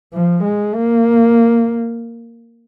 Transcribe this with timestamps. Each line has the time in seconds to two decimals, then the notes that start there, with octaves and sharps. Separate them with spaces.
0.13 F3
0.44 G#3
0.74 A#3